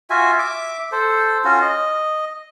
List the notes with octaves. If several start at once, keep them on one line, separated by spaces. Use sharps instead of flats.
F4 F#4 E5 G#5
E5 D6
A4 C5
C#4 F4 F#4
D#5